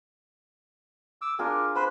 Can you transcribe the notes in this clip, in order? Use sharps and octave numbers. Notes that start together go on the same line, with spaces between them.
D6 E6
D4 F4 G#4 A#4
B4 C5 B5